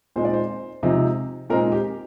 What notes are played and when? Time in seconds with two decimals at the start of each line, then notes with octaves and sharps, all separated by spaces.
0.16 A#2 G#3 C4 D#4 C5
0.25 D5
0.33 C5
0.83 C3 F3 G#3 C4 D#4
1.50 A#2 G#3 C4 D#4 A#4
1.72 G4